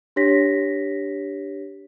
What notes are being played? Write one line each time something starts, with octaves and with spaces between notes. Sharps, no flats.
D4 G4 C#5 A#6 B6